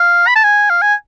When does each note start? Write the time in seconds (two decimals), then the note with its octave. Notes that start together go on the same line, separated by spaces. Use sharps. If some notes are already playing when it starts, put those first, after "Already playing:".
Already playing: F5
0.27 B5
0.35 A5
0.44 G#5
0.70 F5
0.82 G#5